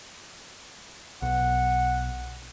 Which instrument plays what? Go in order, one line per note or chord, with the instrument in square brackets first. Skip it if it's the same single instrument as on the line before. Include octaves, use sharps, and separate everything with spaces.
[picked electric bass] B1 [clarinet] F#5